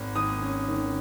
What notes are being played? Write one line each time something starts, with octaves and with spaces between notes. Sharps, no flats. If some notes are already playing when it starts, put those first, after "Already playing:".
Already playing: G#1
D#3 D#6
C#4
D#3